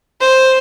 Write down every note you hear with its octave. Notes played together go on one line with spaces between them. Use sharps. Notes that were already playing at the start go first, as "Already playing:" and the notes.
C5